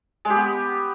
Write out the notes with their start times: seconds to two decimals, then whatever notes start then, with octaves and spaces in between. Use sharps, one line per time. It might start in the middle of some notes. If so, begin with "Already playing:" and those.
0.25 G#3
0.30 G4
0.35 B3